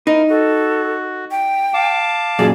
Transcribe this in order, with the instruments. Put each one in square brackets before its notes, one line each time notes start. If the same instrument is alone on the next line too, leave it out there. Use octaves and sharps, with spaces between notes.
[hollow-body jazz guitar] D#4 [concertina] E4 A#4 F6
[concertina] F#4 [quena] A4
[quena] G5
[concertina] F5 A5 D6
[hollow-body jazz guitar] F#2 A#2 D5 [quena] G#4